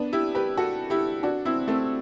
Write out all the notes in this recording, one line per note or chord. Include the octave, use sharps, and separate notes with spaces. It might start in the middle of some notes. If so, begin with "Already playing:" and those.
Already playing: B3 D4
E4 G4
G4 B4
F#4 A4
E4 G4
D4 F#4
C4 E4
A3 C4